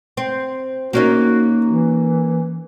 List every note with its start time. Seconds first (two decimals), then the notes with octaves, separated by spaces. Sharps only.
0.17 C4
0.93 A#3 C#4 D#4 F#4
1.66 E3